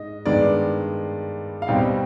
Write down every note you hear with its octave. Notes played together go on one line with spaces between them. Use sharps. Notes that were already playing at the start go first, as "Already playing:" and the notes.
Already playing: G#2 G#3 D#5
G2 D#3 G#3 B3 D5
F5
B2 G3 C4 D#4 G5